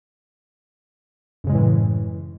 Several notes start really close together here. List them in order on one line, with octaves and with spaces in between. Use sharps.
F#2 C#3 G#3 A2 E3